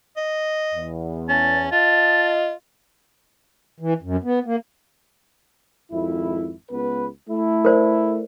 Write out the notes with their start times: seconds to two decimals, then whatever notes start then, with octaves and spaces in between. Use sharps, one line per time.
0.17 D#5
0.74 E2
1.29 C#4 A5
1.72 F4 D#5 A5
3.80 E3
4.02 F#2
4.24 B3
4.46 A#3
5.92 G#1 F2 E4
6.71 C#2 B3 B4
7.29 A3 E4
7.65 A#4 C5 D5